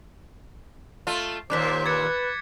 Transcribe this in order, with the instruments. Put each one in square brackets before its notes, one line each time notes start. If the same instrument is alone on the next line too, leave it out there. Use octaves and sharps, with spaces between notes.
[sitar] A3 F4
[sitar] D#2 A#2 C#3 [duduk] C5 [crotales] D6 F#6 B6
[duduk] B4 [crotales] G#6 A6 C#7